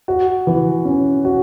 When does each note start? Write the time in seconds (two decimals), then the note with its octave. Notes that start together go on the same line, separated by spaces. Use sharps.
0.08 F#4
0.47 E3
0.85 C#4
1.25 F#4